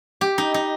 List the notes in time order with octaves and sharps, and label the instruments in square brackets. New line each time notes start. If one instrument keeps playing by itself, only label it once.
[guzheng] G4
D#4
D#4